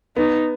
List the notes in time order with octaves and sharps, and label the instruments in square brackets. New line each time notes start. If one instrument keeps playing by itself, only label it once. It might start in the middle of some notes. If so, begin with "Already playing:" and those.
[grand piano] B3 [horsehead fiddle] D#4